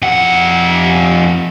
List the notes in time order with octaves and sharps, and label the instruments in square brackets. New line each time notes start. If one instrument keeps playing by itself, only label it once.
[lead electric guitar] F2 F#5